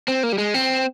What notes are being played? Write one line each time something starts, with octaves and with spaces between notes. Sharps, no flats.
C4
A#3
G3
G#3
C4